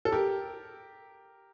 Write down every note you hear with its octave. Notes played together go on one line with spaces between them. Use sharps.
A4
G4 A#4